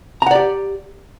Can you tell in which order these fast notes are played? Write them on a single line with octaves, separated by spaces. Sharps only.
A#5 F#5 D5 G4